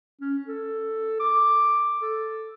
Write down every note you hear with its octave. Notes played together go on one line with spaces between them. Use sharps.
C#4
A4
D6
A4